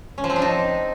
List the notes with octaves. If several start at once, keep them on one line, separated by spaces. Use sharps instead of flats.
C#4
F3
C4
D4
D#4